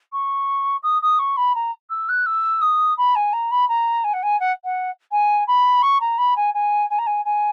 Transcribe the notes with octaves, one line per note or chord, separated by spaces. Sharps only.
C#6
D#6
D#6
C#6
B5
A#5
E6
F#6
E6
D#6
B5
G#5
A#5
B5
A#5
G#5
F#5
G#5
F#5
F#5
G#5
B5
C#6
A#5
B5
G#5
G#5
G#5
A#5
G#5
G#5